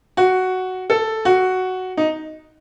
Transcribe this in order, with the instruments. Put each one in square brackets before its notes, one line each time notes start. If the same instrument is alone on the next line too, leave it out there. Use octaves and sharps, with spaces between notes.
[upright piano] F#4
A4
F#4
D#4